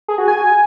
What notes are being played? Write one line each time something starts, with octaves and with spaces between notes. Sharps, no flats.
G#4
F#4
G#5